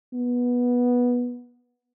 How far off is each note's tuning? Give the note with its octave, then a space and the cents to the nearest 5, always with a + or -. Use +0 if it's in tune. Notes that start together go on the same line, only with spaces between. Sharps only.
B3 -15